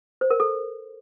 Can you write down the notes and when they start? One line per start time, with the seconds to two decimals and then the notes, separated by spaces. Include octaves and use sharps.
0.21 C5
0.30 A#4
0.40 A4